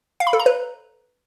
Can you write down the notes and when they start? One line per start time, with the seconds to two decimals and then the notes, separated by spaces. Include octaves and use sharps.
0.20 F5
0.27 B5
0.33 A4
0.40 A#5
0.46 B4